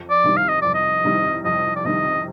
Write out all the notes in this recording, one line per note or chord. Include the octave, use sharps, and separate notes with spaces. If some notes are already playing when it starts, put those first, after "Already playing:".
Already playing: F2
D5
C3 D#3 G3
F5
D#5
F2 D5
D#5
C3 D#3 G3
F2 D#5
D5
C3 D#3 G3 D#5